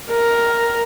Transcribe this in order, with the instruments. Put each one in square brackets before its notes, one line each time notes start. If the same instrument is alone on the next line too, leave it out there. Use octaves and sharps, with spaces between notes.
[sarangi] A#4